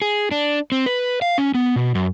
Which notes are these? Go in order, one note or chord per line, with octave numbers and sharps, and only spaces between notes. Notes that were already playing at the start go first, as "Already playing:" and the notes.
G#4
D4
C4
B4
F5
C#4
B3
B2
F#2